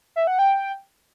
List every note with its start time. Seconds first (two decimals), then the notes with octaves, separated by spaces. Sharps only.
0.16 E5
0.27 F#5
0.39 G5